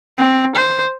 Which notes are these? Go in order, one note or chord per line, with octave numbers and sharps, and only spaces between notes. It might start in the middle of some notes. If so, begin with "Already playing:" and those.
C4
C5